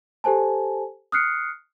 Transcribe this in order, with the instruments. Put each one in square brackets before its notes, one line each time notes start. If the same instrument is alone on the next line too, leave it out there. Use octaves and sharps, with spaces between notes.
[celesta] G4 A4 C5 G#5 A5
D#6 F6 F#6 C7 C#7